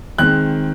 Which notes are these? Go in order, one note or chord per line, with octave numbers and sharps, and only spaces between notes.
D#3 G#3 C4 F#6